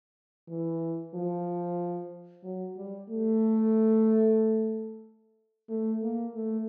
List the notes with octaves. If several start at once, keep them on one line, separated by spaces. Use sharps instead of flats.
E3
F3
F#3
G3
A3
A3
A#3
A3